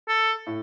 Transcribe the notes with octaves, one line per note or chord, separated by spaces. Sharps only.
A4
A2